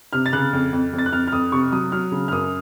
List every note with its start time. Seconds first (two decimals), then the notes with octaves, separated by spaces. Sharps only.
0.13 C3 F6
0.26 A6
0.33 C#3 F#6
0.53 F2
0.73 F2
0.93 F2
0.98 A6
1.06 F#6
1.13 F2 F6
1.28 F6
1.32 F2 D#6
1.52 C3 C#6
1.72 F#3 D#6
1.92 F#3 F6
2.12 C#3
2.28 F6
2.31 F#2 D#6